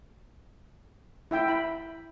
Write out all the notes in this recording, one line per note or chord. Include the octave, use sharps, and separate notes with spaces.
E4 E5 G5
B5